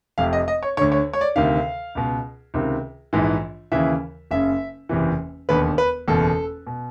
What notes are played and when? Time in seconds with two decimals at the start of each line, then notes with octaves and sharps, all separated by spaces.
0.18 F1 F2 C3 F5
0.33 D#5
0.48 D#5
0.63 C#5
0.77 D2 D3 C#5
0.92 C#5
1.13 C#5
1.21 D5
1.36 D2 C3 D#3 F5
1.95 C#2 B2
2.54 C#2 C3 D#3
3.13 A#1 G#2 E3
3.72 D#2 C#3 E3 E5
4.31 F#1 F#2 C#3 E5
4.89 F#1 E2 C3 E3
5.49 E1 D#2 D3 B4
5.78 B4
6.08 F#1 E2 B2 A4
6.67 B2